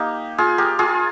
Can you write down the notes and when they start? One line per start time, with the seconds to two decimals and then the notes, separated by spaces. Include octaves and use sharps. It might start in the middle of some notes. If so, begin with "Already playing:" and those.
Already playing: A#3 D#4 G4
0.38 F4 G#4
0.58 G4 A#4
0.79 F4 G#4